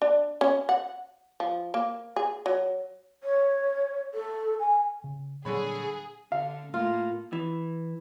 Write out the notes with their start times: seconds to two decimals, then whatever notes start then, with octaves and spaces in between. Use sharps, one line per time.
0.02 D4
0.41 C#4
0.69 F#5
1.40 F3
1.74 A#3
2.16 G#4
2.46 F#3
3.23 C#5
4.14 A4
4.60 G#5
5.04 C#3
5.45 A#2 D3 F#3 G3 G#4 C#5 B5
6.32 D3 F5
6.74 A2 A#3 F4
7.33 E3